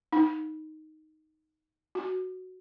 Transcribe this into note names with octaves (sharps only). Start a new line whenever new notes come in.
D#4
F#4